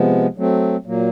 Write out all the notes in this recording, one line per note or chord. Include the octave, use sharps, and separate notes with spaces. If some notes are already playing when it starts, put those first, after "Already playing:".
Already playing: C3 F3 G#3 B3
F#3 A3 C4
A#2 F#3 A#3